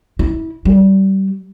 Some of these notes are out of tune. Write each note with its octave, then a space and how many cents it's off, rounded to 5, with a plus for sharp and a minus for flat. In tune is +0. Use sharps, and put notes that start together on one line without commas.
E4 -30
G3 -25